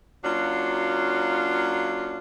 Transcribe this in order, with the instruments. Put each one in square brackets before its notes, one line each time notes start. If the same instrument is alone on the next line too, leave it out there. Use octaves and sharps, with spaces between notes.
[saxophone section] F#3 A#3 C#4 D4 F4 F#4